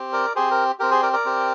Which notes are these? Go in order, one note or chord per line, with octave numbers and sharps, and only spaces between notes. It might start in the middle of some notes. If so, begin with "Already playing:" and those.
Already playing: C4 G4
A#4 D5
C4 G4 G#4 C5
A#4
C4 G4 A#4
G#4 C5
A#4 D5
A#4 D5
C4 G4